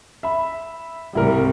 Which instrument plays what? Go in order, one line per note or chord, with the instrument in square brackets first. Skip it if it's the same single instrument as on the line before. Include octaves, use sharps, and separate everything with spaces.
[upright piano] E5 B5
[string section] C2 G#2 [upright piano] G3 E4 A#4